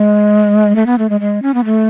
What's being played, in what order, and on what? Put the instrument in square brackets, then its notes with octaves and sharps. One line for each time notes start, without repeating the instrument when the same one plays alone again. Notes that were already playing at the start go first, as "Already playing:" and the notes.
Already playing: [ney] G#3
A3
B3
A3
G#3
G#3
C#4
B3
A3